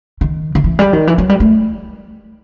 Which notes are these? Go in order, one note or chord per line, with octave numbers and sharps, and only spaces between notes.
D#3
D#3
E3
G3
D#3
E3
F#3
G3
A3